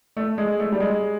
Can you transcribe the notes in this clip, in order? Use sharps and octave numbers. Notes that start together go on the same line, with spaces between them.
A3
G#3
A3
G3
G#3